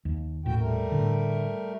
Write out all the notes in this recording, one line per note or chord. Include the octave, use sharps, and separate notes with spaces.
D#2
D#1 A2 F#4 G5
G3 A3 A#4
A2 D3